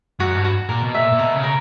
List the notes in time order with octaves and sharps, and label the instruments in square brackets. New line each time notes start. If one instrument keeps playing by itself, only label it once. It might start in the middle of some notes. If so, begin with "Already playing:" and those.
[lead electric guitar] F#2 [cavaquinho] F#4
[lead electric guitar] G2
[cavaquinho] F#4
[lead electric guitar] A#2 [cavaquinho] A#4
[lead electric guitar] B2
[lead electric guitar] A#2 [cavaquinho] E5
[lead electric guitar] A#2
[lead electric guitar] B2 [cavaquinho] A#4
[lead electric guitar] C#3
[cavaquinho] A#4